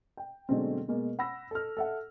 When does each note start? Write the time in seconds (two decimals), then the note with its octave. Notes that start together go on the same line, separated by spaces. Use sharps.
0.17 G5
0.49 B2 D3 F#3 G#3 A3 C4
0.88 B2 G#3 A#3
1.19 F#5 B5 E6 A#6
1.51 A4 F6
1.77 A4 E5 F#5